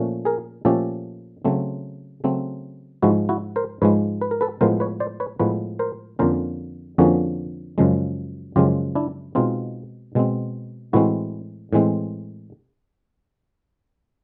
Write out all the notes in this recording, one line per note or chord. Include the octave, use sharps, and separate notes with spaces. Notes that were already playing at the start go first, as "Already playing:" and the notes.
Already playing: A#2 F3 A3 C#4
G#4 A#4
A#2 F3 A3 C#4 G4 A4
C#3 F#3 A3 C4
C#3 F#3 A3 C4
G#2 F3 G#3 E4 F#4
E4 F#4
A#4 C5
G#2 F3 G#3 B4 C#5
B4
A#4
A4 B4
A2 F3 G#3 B3 A#4 C5
B4 C#5
C5 D5
B4 C#5
A2 F3 G#3 B3 B4 C#5
A#4 C5
F2 D3 F3 A#3 C#4 A#4 C5
F2 D3 F3 A#3 C#4 F#4 G#4
F#2 C#3 F3 G#3
F#2 C#3 F3 G#3 F4 G4
D4 E4
B2 G#3 C4 D#4 F4
B2 G#3 C4
A2 E3 G#3 C4 E4 F#4
A2 E3 G#3 C4